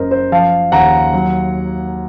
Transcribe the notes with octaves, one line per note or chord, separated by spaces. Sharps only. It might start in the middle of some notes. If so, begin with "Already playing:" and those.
Already playing: F#1 C#3 A#4 C5 D#5
C5
F3 F5 A5
D#2 F#5 A#5
F#3